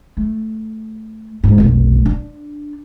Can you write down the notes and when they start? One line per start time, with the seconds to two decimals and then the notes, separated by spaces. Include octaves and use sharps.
0.17 A3
1.44 D2 G#2
1.58 F1 B1
2.06 D4